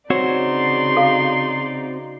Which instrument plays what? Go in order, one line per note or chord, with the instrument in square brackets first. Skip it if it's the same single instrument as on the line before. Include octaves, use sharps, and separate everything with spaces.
[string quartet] C#3 D#4 D5 [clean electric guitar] C4 F#4 C#5 [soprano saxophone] C6
[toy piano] A4 F5